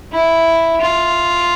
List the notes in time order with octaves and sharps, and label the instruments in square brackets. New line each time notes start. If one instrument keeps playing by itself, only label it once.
[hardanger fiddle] E4
F4